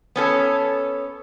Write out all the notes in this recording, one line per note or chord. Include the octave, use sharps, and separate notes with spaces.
B3 C#4 A4